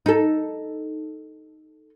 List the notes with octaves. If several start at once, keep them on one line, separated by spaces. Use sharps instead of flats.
D#4 A4